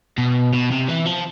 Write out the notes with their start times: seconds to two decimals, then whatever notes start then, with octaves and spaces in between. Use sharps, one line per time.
0.18 B2
0.53 B2
0.71 C3
0.89 E3
1.06 F3